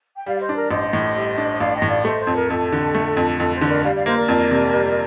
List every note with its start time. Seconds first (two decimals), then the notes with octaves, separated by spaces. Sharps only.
0.18 G5
0.26 G3 D5 F5
0.36 F5
0.40 C5 D#5
0.49 D4
0.55 A#4 D5
0.71 A1 C5 D#5
0.93 A2
1.16 G3
1.38 D4
1.60 A1 D5 F5
1.75 D#5 G5
1.82 A2
1.89 D5 F5
2.05 A3 C5 D#5
2.20 C5
2.27 F2
2.35 A#4
2.50 F2 A4
2.72 D3
2.95 A3
3.17 F2
3.39 F2 A4
3.54 C5
3.61 D3
3.69 A#4 D5
3.84 G3 D5 F5
3.95 D5 F5
4.06 A#3 C5 D#5
4.17 A#4 D5
4.28 F2
4.51 C3
4.73 G3